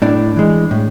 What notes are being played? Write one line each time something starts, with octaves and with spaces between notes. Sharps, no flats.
A2 D4
E3 G#3
A2